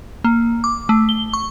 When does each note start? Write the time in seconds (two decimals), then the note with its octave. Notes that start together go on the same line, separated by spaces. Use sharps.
0.24 A#3
0.64 D6
0.89 A3
1.09 G7
1.33 C#6